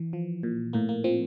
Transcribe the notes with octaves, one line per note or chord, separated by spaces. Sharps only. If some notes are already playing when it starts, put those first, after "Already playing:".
Already playing: E3
F3
A#2
A2 A#3
A#3
F3 C4